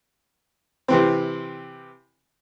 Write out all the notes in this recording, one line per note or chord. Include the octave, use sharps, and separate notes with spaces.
C3 E3 C4